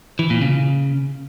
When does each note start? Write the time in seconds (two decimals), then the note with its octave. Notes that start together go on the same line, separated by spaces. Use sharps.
0.19 E3
0.30 A#2
0.41 C#3